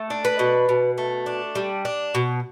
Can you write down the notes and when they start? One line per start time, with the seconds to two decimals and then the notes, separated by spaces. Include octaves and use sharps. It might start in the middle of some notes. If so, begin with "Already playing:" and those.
Already playing: A3
0.10 D4
0.25 B4
0.39 B2
0.69 B2
0.98 A3
1.26 D4
1.55 G3
1.85 D4
2.15 B2